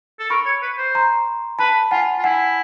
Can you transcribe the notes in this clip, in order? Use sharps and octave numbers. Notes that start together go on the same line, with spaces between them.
A4
A#4 B5 C#6
C#5
B4
C5
A#5 C6
B4 A5 B5
F4 F#5 G#5
F4
E4 F#5 G#5